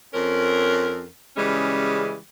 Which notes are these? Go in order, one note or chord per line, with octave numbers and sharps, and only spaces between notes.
F2 C4 C#4 A#4
C#3 E3 G3 G#3 C#4